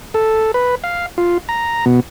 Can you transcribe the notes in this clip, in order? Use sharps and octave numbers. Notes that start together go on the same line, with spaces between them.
A4
B4
F5
F4
A#5
B2